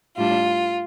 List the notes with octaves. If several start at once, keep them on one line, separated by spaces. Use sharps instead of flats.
A2 G3 D4 F4